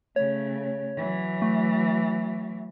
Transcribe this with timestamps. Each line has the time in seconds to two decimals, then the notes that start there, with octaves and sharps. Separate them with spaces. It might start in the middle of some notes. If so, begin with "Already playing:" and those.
0.16 C#3 A3 C#5
0.97 E3 F#3
1.42 A3